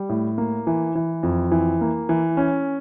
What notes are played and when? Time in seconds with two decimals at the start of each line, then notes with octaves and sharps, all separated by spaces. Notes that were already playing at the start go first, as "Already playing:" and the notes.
Already playing: G3
0.09 A2
0.38 A#3
0.67 E3
0.95 E3
1.23 F2
1.51 E3
1.81 A#3
2.09 E3
2.37 C#4